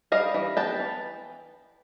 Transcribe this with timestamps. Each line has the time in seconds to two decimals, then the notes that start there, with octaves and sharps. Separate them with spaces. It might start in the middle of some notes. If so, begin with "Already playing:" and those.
0.12 G3 D#5 F5
0.34 E3
0.57 B3 G5 A5
0.79 E3